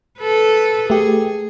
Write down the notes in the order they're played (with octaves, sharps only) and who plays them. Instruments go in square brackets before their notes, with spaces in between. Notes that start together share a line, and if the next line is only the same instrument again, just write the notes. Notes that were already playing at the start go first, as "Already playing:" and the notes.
[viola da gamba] A4 B4
[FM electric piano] A3 G4 [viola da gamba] G#4